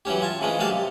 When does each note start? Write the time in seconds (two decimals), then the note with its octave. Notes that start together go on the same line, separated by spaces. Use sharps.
0.05 E3 F#3 C#4 G4
0.22 F4 G#5 A5
0.41 C#3 E3 F3 G#3 C#4
0.59 F#3 G#3 A#3 G4 F5 A5
0.71 C3